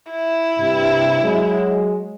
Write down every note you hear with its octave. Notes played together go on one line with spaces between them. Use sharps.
E4
G2 C3
F#3 G#3